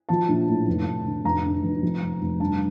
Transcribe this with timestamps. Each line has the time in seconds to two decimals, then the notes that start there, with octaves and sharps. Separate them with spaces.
0.09 F3 A5
0.29 A#1
0.48 A2
0.68 F1
0.87 F1
1.06 D3
1.25 F1 A#5
1.45 D3
1.63 F1
1.83 F2
2.02 F1
2.22 F1
2.40 G2 A5